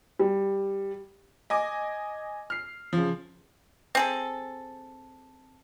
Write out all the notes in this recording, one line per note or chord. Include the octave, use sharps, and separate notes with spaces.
G3
D#5 G#5 D6
F6 C7
C#3 F3
C4 G#4 A4